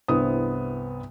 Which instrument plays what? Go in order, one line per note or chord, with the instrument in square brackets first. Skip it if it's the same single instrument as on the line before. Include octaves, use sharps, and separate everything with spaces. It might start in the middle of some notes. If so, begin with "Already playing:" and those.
[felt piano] C2 G2 B3 E4 C5 D#6